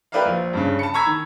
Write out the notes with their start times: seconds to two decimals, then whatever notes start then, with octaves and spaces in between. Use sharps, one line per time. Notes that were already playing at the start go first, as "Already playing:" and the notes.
0.12 G4 A#4 B4 D5 E5 F5
0.25 A#1
0.53 G2 C#3
0.79 A5 B5 C#7
0.94 A#5 B5 C#6 E6 G#6 B6
1.06 D#3